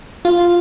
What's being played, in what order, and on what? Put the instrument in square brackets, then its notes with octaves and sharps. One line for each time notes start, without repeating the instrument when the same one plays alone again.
[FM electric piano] F4